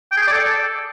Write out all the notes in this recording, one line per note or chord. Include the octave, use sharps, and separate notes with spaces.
G5
G#4
G5
D5
A4